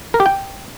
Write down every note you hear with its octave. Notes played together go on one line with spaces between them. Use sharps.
A#4
G4
G5